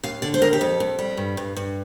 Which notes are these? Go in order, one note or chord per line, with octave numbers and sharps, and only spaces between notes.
D#2 F5
D3 D5
C5
D#2 A#4
G4
F2 A4
F2
G3
G2
G2
G2